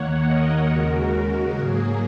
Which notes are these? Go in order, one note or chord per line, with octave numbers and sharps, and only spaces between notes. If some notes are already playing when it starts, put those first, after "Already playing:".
Already playing: D#2 D#3 A#3 C#5 F#5
A#4 D#5
D#2 C#3 G#3 F#4 A#4
G#2 F#3 A#3 G#4